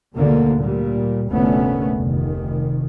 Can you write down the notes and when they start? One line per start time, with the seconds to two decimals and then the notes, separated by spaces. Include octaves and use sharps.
0.16 D2 G#2 B2 D3 A#3
0.57 A#2 G3
1.28 F1 D2 A#2 A3 B3 C#4
1.97 F1 D#3